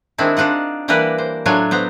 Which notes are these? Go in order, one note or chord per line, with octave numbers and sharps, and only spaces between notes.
D#3 G#3 C4 D4 E4
D4 D#4 F4 F#5
E3 G3 A#3 D4 A#4 B4
C5
A2 F#3 D4 F4 C#5 G#5
B3 C5 A#5